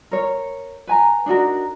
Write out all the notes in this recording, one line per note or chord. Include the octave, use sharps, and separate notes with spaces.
A#4 C#5
B4 G#5 A#5
D4 D#4 F#4 A#4